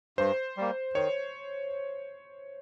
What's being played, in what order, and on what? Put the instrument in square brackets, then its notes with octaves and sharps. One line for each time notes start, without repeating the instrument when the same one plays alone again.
[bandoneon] G2 [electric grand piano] C5
[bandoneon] G3 A#3
[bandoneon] D#3 [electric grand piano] C#5